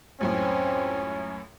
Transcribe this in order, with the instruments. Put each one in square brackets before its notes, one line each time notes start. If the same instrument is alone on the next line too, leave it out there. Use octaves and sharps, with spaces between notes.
[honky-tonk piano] C#2 F#2 A2 [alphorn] C4 [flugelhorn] C#4